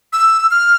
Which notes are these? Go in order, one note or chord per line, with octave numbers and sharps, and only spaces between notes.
E6
F6